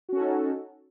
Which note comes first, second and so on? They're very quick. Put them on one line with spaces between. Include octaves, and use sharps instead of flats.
F#4 C#4 A4 D#4